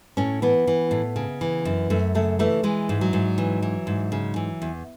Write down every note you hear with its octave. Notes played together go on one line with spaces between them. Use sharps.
A2 C#4
E3 B3
E3
A2
C#3
E3
F#2
F#2 A3
C#3 A3
E3 A3
E3 G#3
G#2
F#3
G#2
E3
E3
G#2
C#3
E3
E2